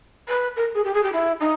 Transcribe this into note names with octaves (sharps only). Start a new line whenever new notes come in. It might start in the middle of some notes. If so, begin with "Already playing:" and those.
B4
A#4
G#4
G4
G#4
G4
E4
D#4